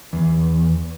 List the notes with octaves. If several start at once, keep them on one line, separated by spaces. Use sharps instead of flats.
E2